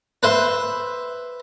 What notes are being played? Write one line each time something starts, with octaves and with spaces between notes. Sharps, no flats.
B4 C5 E5